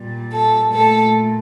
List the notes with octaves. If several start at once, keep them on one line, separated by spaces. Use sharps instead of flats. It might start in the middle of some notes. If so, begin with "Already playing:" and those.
Already playing: A#2 G3
A4
A#2 A3 A4